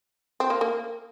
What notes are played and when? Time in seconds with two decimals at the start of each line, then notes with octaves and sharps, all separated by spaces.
0.40 C4
0.50 A#3
0.61 A#3